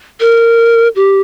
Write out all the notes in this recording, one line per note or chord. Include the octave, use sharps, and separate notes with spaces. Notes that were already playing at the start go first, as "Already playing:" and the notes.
A#4
G4